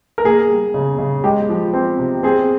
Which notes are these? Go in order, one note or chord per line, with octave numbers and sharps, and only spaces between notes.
A#4
A#3 G#4
G3
C#3
C#3
G#3 G4
F3
C4
C3
C4 G#4